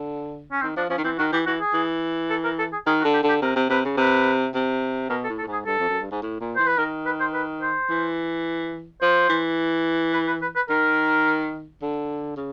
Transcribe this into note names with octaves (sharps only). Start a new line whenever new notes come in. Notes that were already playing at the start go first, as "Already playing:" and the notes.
Already playing: D3
C#4
D#3 C4
F3 D4
F3 C#4
D#3
E3 C4
D#3 F#4
E3 G4
E3 F#4
G#4
E3
A4
A#4
A4
G#4
D#3 G#4
F#4
D3
G4
D3
G4
C3 A#4
C3
C3 B4
C#3
C3 B4
C3
B2 A#4
A4
A2
A4
A2
G#2
G#4
G2 A4
F2
F#2
G2
G#2
A2
A#2
E3 C5
B4
D#3 A#4
B4
C5
B4
C5
E3
F3 C5
E3
B4
B4
B4
B4
D#3 A#4
D3
C#3